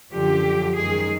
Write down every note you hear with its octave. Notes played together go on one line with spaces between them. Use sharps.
F#2 D3 F3 G4
F#2 D#3 G#3 G#4